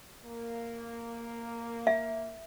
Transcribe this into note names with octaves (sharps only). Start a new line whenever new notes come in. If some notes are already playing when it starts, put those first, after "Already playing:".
A#3
E5